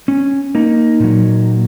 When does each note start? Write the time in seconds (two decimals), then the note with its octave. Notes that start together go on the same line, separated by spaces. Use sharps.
0.08 C#4
0.55 A#3 D#4
1.00 A#2 F#3